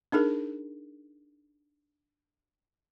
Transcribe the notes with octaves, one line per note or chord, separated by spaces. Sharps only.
D4 D#4 G#4 A#4